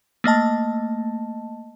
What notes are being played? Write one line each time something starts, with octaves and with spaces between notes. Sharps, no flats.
A3 A#3 D#5 A5